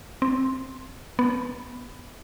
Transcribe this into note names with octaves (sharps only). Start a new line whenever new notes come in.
C4
B3